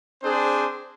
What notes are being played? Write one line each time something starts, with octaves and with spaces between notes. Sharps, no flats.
C4 D4 G#4 C5